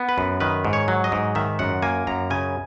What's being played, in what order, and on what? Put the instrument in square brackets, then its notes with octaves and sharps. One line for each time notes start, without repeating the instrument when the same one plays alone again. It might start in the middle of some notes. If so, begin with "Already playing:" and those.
Already playing: [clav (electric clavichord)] B3
B4
F#2
D#3 B4
G#2
C#5
F#3
D#5
G#2
D#3 E5
F#2 F#5
A#3 G#5
F#2 A#5
C#3 G#5